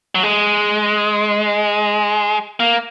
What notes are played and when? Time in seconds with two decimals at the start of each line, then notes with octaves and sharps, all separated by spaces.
0.15 F#3
0.23 G#3
2.60 A#3